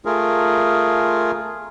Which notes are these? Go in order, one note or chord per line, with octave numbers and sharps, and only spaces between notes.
A3 F4 G#4 A#4